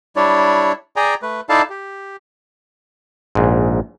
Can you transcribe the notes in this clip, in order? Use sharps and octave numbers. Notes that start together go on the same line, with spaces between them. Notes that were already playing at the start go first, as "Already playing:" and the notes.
G3 D4 E4 C#5 D5
G#4 D5 G5 G#5 A#5
A3 B4
D#4 E4 A4 D5 F5 A5
G4
A#1 G#2